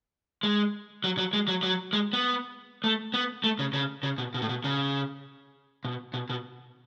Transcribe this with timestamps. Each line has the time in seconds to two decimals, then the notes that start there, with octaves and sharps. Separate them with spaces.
0.43 G#3
1.04 F#3
1.18 F#3
1.33 G#3
1.48 F#3
1.63 F#3
1.93 G#3
2.13 B3
2.84 A3
3.14 B3
3.44 A3
3.59 C#3
3.73 C#3
4.03 C#3
4.18 B2
4.34 B2
4.42 A2
4.49 B2
4.64 C#3
5.85 B2
6.14 B2
6.30 B2